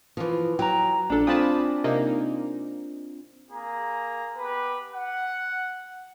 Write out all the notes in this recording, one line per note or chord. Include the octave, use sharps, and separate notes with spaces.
E3 F3
F#3 G5 A#5
A#1 D4 A4
C4 F4 G#5 A5 B5 D#6
C3 A#3 D#4
A#3 G#4 A#5
B3 G4 B4
F#5